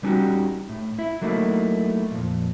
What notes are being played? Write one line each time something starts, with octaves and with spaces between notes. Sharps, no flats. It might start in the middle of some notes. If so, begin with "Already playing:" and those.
G3 B3 C#4 D#4 F#4 G4
A2
E4
F#3 A3 A#3 D#4 E4
F2 A#2